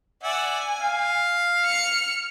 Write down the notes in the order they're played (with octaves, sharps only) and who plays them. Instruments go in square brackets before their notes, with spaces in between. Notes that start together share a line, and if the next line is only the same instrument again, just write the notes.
[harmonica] D5 E5 F#5 [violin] G#5
[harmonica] F5
[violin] F6 C#7